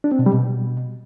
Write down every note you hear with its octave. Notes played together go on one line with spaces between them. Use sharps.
D4
C4
B2
G3
B2